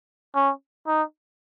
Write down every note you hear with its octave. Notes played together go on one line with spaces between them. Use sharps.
C#4
D#4